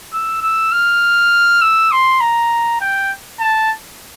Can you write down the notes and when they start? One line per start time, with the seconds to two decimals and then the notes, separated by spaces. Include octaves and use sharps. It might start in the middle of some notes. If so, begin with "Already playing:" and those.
0.13 E6
0.42 E6
0.72 F6
1.62 E6
1.92 C6
2.21 A#5
2.81 G5
3.40 A5